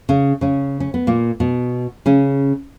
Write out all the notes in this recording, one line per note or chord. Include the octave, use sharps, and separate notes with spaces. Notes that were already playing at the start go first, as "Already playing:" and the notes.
C#3 C#4
C#3 C#4
C#4
B3
A#2 A#3
B2 B3
C#3 C#4